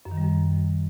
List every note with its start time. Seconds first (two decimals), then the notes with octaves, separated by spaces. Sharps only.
0.05 F#2
0.11 D#3
0.18 G3
0.24 F#2